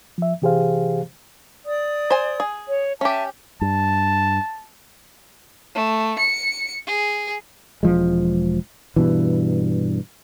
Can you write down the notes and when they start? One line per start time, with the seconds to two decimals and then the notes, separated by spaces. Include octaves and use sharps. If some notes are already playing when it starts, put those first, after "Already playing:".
0.18 F3 E5
0.42 C3 E3 G4 G#4 C5 F5
1.66 D5 D#6
2.10 C5 G#5
2.40 G#4
2.68 C#5
3.01 C#4 G4 E5 G#5 A5
3.61 G2 A5
5.75 A3
6.19 C#7
6.87 G#4
7.83 E1 F3 G#3
8.96 G2 B2 E3